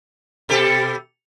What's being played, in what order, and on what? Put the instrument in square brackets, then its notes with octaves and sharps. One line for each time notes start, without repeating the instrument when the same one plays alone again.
[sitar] B2 G4 A4